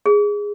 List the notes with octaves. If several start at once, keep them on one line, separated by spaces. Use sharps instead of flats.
G#4